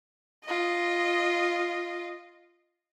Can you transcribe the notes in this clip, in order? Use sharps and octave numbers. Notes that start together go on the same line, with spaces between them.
F4 D#5